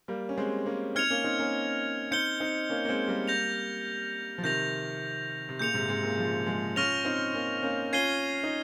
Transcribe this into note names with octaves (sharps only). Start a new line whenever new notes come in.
G3 A#3
C#4
G#3 C4
A#3 C#4
C4 D#4 F6 G#6 C#7 F7
A#3 C#4
C4 D#4
A#3 C#4
C4 D#4 G6 C#7 G7
C4 D#4
A#3 C#4
A#3
G#3 C4
G3 A#3
G6 A#6 F7
F3
C3 D#3 G6 A#6 F7
C3
A#2 C#3 G6 C#7 F7
G#2 C3
G#2 C3
A#2 C#3
C#3 F3
F3 G#3
C#4 F4 C#6 F6 A#6 F7
C4 D#4
A#3 C#4
A#3 C#4
C#4 F4 G#6 C7 D#7 G7
D#4